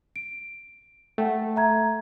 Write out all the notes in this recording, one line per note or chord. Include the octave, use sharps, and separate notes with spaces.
D7
A3 F#5 G5
E5 A#5 G#6